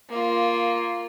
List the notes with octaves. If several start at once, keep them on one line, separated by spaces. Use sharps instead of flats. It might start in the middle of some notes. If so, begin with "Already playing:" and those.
A#3 F4